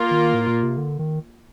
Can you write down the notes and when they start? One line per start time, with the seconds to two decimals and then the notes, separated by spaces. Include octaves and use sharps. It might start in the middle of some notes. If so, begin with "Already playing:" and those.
Already playing: A#3 F4 A#4
0.11 D#3
0.34 A2
0.48 A#2
0.63 C3
0.77 D3
0.99 D#3